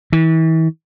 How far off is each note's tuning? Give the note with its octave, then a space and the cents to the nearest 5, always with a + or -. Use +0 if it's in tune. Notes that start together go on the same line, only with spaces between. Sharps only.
E3 -35